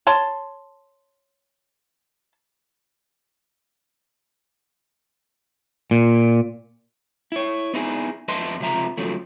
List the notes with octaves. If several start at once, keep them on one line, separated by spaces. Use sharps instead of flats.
C#5 A5 C6
A#2
E4 C#5
B3 D#4 E4 F#4 G#4
F2 B4 D#5 E5 A5 C6
C#2 C3 F3 E5 A#5
G2 C#3 F3 F#3 A3